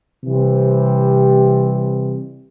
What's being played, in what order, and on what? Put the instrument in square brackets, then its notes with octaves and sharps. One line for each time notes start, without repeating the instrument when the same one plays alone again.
[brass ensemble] C3 E3 G3 C4